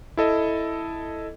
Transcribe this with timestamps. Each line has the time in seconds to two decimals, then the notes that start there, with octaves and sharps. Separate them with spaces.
0.17 E4 A4 D#5